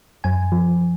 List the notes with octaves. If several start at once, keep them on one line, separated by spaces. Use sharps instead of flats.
F#2 G#5
F3